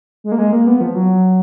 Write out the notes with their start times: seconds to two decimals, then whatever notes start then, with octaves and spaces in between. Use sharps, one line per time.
0.24 G#3
0.32 A#3
0.38 G#3
0.53 A#3
0.67 B3
0.81 F3
0.95 F#3